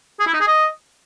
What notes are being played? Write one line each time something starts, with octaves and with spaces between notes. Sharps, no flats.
G#4
E4
D#4
G#4
D#5